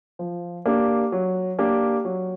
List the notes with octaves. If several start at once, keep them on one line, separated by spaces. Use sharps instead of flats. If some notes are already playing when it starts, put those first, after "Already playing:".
F3
A#3 D4 G4
F#3
A#3 D4 G4
F#3